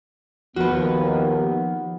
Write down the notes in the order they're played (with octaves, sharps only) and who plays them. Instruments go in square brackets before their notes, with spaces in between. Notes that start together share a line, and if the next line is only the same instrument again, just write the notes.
[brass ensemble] D#2 [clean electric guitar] F3 [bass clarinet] B3 [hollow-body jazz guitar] F#4 B4